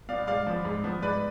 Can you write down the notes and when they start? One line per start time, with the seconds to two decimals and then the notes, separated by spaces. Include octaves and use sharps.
0.09 B2 B3 D5 F5
0.27 G#2 D5 F5
0.47 F3 B3
0.65 G#2
0.84 F3 B3
1.02 G#2 B4 D5